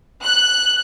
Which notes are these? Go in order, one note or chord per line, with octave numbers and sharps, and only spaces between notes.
F#6